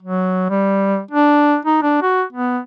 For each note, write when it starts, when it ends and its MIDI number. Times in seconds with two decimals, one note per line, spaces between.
0.03 0.46 54
0.50 1.00 55
1.11 1.57 62
1.65 1.79 63
1.83 2.01 62
2.02 2.24 66
2.33 2.60 59